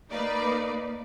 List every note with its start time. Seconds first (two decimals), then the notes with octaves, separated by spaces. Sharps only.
0.11 A#3 D#4 B4 D5